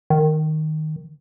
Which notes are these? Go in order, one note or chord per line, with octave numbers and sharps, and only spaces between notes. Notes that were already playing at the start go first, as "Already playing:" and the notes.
D#3